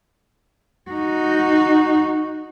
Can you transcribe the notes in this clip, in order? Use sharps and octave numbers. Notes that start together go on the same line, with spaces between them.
D#4 F#4